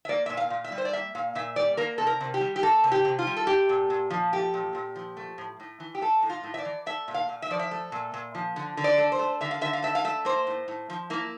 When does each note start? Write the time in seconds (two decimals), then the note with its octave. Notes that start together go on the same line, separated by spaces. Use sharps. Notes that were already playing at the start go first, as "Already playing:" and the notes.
0.05 E5
0.09 A#3 D5
0.26 A#2 E5
0.37 F5
0.50 A#2
0.64 E5
0.72 G3
0.78 C5
0.85 D5
0.93 A#3 E5
1.15 A#2 F5
1.35 A#2 E5
1.56 G3 D5
1.77 A#3 A#4
1.98 C3 A4
2.07 A#4
2.21 C3
2.34 G4
2.41 G3
2.56 G4
2.63 A#3 A4
2.84 C3
2.92 G4
3.05 C3
3.19 F4
3.27 G3
3.37 A4
3.47 A3 G4
3.69 A#2
3.90 A#2
4.10 F3
4.32 A3 G4
4.54 A#2
4.75 A#2
4.96 F3
5.17 A3
5.38 A2
5.60 A2
5.80 E3
5.95 G4
6.02 A3 A4
6.22 A2
6.30 F4
6.44 A2
6.54 E5
6.58 D5
6.65 E3
6.86 A3 E5
7.08 A#2
7.14 F5
7.29 A#2
7.42 E5
7.50 F3 D5
7.59 E5
7.71 A3
7.92 A#2
8.14 A#2
8.35 F3
8.56 D3
8.77 D3
8.84 D5
8.98 A3
9.12 C5
9.19 A3
9.41 D3 E5
9.51 F5
9.61 D3 E5
9.73 F5
9.82 A3 E5
9.95 F5
10.04 A3 E5
10.25 A#3 C5
10.47 A2
10.68 A2
10.90 F3
11.10 A#3 E4